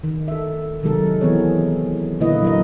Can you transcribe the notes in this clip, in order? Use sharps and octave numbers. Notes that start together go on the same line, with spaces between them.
D#3
A4 E5
C3 D#3 F#3 G#3 A4 A#4
E3 B3 C4 G#4 C#5
A#2 D3 A#3 E4 B4 D#5
F#3 A#4 D#5